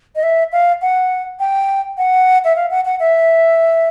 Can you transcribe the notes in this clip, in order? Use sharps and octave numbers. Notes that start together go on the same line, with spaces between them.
D#5
E5
F5
F#5
G5
F#5
E5
F5
F#5
F#5
E5